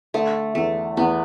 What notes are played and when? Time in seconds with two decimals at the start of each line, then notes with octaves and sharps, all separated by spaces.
0.14 D3 A3
0.55 E2 A3
0.97 E2 B3